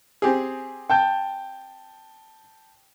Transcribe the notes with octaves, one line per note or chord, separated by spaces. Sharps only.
C4 G4 G#4
G5 A5 G6